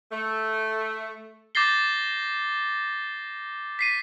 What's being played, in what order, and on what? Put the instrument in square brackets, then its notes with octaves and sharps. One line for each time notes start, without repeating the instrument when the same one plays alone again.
[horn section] A3
[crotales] D6 G6 A6 A#6 C7 G7
B6 C7 D#7